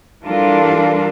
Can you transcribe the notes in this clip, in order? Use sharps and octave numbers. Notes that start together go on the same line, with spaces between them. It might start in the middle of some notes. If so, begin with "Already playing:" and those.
E3 G3 D4 F4 A4 A#4